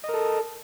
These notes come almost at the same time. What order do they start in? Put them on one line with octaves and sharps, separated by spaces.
D#5 A#4 A4